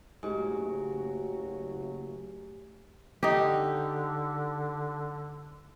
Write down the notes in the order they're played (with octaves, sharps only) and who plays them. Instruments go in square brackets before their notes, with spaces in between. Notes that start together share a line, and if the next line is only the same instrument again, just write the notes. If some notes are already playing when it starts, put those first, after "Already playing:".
[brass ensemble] F#1 F#3 [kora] G#2 [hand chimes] A3 G4 G#5 [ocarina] F#4
[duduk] D3 [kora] D#4 G4